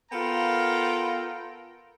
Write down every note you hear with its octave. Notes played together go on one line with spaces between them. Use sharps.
B3 F4 A4 A#4 G5 A#5